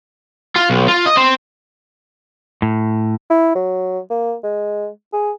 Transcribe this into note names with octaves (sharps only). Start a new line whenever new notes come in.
F4
B1
F4
D#5
C4
A2
E4
F#3
A#3
G#3
G#4